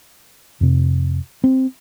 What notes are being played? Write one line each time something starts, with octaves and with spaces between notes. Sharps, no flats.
F2 C3
C4